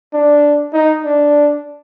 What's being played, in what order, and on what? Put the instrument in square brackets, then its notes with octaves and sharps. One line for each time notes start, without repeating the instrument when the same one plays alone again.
[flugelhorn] D4
D#4
D4